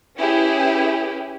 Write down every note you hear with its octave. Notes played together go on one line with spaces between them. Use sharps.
C#4 E4 G4 G#4 B4